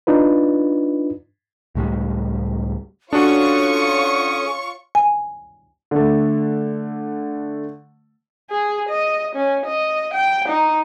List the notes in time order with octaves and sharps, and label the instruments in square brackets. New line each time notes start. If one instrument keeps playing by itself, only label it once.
[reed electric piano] D4 D#4 F4 B4
[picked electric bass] C#2 A2 G3 G#3
[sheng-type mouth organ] C#4 D#6 [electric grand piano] D4 F#4 [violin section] F4 C#5 C#6 [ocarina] A4
[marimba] G#5
[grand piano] D3 A3
[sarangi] G#4
D#5
C#4
D#5
G5
D#4